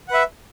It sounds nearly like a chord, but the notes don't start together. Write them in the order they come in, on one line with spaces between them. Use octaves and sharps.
F#5 B4 E5